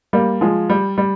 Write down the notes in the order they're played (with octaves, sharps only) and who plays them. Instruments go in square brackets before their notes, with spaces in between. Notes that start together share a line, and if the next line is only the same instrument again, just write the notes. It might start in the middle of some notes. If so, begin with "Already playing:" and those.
[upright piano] G3 A#3
F3 G#3
G3
G3